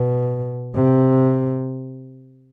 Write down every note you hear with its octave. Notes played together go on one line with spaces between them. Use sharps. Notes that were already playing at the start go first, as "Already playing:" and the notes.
Already playing: B2
C3